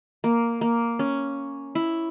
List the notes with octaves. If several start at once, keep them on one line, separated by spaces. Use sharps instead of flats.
A#3
A#3
C#4
E4